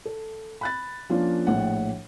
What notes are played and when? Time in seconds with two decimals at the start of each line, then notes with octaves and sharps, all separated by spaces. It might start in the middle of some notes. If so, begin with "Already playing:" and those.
0.05 A4
0.61 B5 F#6 A6
1.10 F3 A#3 C#4 D4 F4
1.47 A#1 A2 F#5